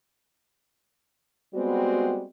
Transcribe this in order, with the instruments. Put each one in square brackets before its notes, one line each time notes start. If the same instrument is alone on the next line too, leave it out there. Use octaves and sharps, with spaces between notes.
[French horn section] G3 G#3 B3 C4 F#4